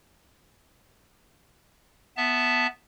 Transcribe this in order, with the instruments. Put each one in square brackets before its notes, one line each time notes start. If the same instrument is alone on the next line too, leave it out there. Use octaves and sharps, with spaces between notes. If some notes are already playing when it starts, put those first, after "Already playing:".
[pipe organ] B3 E5 A5